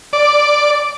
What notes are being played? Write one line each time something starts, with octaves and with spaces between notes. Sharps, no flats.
D5